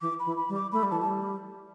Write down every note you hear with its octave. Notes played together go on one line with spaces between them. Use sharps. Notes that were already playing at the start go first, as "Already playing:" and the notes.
E3 D6
B5
E3
B5
G3
D6
A3 B5
G3
E3 A5
G3 A5